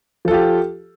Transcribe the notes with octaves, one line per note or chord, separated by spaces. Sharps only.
F3 F4 G4 A4